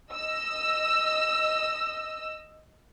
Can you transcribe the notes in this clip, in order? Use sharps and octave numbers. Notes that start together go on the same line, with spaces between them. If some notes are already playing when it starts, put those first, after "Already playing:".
D#5 E6